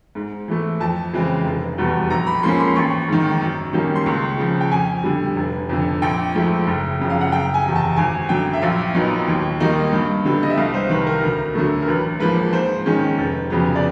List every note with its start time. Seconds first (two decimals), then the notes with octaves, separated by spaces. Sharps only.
0.15 G#2
0.48 E3 A3
0.80 F2 A5
1.13 C#3 E3 G#3 C4
1.45 F1
1.78 E2 B2 G3 B3
2.10 A#1 A#5
2.27 B5
2.43 G#2 F3 A#3 C#4 C6
2.60 C6
2.76 A1 C#6
3.08 G#2 D#3
3.41 F#2
3.73 D#3 G3 A#3 C#4
3.96 C6
4.06 C#2 C#6
4.38 C#3 F3
4.61 G5
4.71 F2 G#5
5.04 D3 G3
5.36 F1
5.69 F2 D3
6.02 A#1 G5
6.35 G#2 F3 A3
6.67 F#1
7.00 F#2 C#3 F3
7.10 F5
7.21 F#5
7.32 F#1 G5
7.54 G#5
7.64 E2 C3
7.76 A5
7.96 G#1 G#5
8.29 F#2 D3 F#3 G5
8.53 E5
8.62 A#1 F5
8.94 A#2 F#3 B3 D#4
9.28 D#2
9.60 D#3 G3 A#3 D#4
9.93 G2
10.25 D3 G3 B3
10.43 D#5
10.50 E5
10.58 C2 F5
10.74 C5
10.90 C3 D#3 B4
11.07 A#4
11.23 D2
11.55 D3 F#3 A3
11.82 A#4
11.87 A1 B4
12.20 G#2 F3 A#3 B4
12.53 G#2 C5
12.86 D#3 G#3 C#4
13.18 F1
13.50 F2 C#3 F#3 B3
13.76 D5